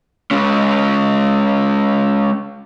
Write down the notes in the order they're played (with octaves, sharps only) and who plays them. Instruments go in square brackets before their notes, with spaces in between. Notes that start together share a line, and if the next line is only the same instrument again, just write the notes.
[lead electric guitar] G#3 C#4